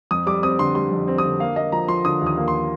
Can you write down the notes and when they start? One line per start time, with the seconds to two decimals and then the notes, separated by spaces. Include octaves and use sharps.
0.11 F2 D#6
0.27 G3 D6
0.43 C4 D#6
0.59 D3 C6
0.75 G3 C6
0.92 F2
1.08 C4
1.18 D#6
1.24 D3
1.40 A#3 F5
1.56 A#3 D#5
1.72 F3 A#5
1.88 F3 C6
2.05 D3 D#6
2.21 D#2
2.26 D#6
2.37 A#3
2.48 C6